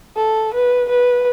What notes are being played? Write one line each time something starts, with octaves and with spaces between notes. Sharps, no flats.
A4
B4
B4